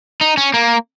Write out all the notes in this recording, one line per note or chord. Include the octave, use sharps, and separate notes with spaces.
D#4
C#4
A#3